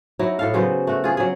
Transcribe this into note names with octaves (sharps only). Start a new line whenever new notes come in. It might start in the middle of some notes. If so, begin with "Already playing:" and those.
F#3 D#4 E4
A2 A4 F5
C#3 F#3 B3 C5
A3 F#4
F4 G#4
F#3 G#4